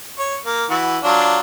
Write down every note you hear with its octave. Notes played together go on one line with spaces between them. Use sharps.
C#5
A#3
E3 F#4
F#3 D4 F4